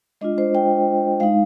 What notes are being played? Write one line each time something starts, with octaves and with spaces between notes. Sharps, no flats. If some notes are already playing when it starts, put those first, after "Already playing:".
G#3 D4 F4 D#5
C5
G5
G#3 D#4 F5